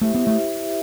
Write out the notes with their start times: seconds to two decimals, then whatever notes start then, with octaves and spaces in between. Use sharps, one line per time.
0.01 A3 E4 G4 C5 E5
0.15 B3
0.27 A3